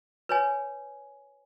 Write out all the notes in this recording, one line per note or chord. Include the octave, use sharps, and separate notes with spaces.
B4 C#5 G#5